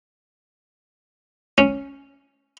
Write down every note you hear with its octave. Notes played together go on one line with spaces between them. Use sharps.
C#4